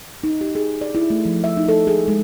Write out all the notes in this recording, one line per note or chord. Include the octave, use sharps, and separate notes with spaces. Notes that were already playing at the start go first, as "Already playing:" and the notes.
D#4
G4
G#4
D5
E4
A3
F3
E5
D#4
A4
G#4
G#3